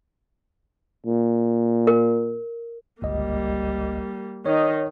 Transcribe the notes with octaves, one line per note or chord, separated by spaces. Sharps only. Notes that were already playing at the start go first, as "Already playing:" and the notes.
A#2
A#4
G1 C#2 G3 A#3 D#5
D#3 D#4 C#5